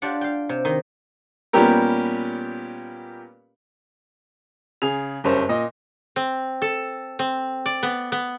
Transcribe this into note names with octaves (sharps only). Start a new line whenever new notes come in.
D4 F4 G4 D5 F#5
F5 G5
C3
D#3 D#4 D#5
A#2 G3 B3 C#4 G4 A#4
C#3 G#4 F7
F#1 G2 C#4 C5
A#2 D#5
C4
A4
C4
D5
B3
B3